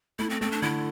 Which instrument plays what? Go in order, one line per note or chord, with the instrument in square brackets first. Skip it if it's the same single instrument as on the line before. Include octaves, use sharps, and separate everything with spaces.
[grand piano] A3 [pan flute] E4
[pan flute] C4
[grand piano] A3 [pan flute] C4
[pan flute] D4
[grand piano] D3 [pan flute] E4